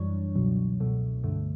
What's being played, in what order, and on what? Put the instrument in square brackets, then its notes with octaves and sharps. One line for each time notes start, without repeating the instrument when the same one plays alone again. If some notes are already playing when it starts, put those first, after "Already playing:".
Already playing: [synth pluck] F#2 E3 G3 D4 C#5
C#2 B2 F#3
C#2 B2 A3
G2 D3 A3